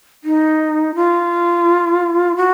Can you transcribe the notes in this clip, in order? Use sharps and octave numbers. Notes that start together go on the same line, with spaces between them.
D#4
F4
F#4